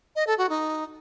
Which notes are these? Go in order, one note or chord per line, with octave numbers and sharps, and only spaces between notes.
D#5
A4
F#4
D#4